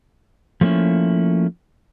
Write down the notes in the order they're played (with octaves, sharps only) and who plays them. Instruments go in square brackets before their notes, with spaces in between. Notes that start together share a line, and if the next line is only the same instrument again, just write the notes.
[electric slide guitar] F3 A3 A#3 C#4 E4